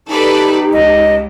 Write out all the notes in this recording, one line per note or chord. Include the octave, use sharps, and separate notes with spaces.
D#4 G4 A4 B4 D5
C#2 D#5